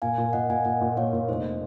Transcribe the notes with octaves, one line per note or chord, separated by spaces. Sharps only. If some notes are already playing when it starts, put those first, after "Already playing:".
A#2 F5 G#5
A#2
A#2 D#5 F#5
A#2 F5 G#5
A#2 D#5 F#5
A#2
A#2 C#5 F5
A#2
F1 C5 D#5